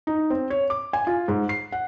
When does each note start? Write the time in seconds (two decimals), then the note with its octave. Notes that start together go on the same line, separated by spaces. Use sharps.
0.07 D#4
0.30 C4
0.50 C#5
0.70 D6
0.93 G#5
1.07 F4
1.28 G#2
1.49 C7
1.72 F#5